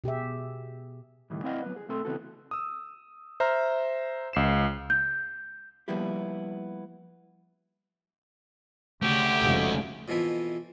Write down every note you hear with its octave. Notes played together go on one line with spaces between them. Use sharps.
B2 G4 G#4 E5
C#2 A2 D#3 E3 G3
C4 E4 D5 D#5 F5 F#5
F#3 B3 B4
G#4
B1 A3 C4 A4 C6
C#3 E3 B3 C4 F#4 A4
D#6 E6
C5 E5 A#5 F6
C#2 C7 E7
G6
F3 G3 A#3 B3 E4 G4
C#3 A3 F#4 G4
F1 C#3 G#3
F2 B2 E3 F3 E4